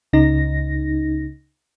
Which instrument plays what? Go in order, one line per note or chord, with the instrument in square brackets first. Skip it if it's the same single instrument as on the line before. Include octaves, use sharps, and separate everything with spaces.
[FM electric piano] C#2 C#3 D#4 A#6